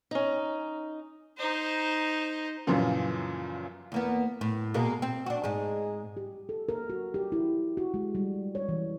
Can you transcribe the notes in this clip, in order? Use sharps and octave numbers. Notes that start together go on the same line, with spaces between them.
C#4 D#4
D#4 C5
F#2 A#2 C#3 E3 F3
E2 A#3 B3
A2
B2 G#3 A#3
C4
D4 F#4
G#2 G#3
G4
A4
A#4
F#4
G4
E4
F#4
G#3
G3
C#5
E3